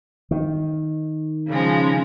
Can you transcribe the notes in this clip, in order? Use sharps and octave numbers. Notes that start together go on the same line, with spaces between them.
D#3
C#3 F3 G#3